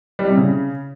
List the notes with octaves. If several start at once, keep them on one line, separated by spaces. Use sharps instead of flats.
G3
C3
C#3